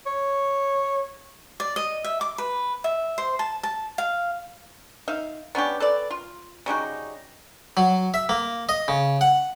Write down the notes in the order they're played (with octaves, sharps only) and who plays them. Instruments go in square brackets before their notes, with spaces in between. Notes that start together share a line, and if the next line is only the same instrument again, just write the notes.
[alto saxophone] C#5
[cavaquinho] D5
D#5
E5
D6
B4
E5
C5
A5
A5
F5
[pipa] D#4 E5 F5
B3 C#4 D4 G4
A4 B4 D5
F4
C#3 G3 D#4 F#4
[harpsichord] F#3
E5
A#3
D#5
C#3
F#5